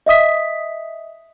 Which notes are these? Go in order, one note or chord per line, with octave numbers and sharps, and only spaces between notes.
D#5 E5 D#6 B6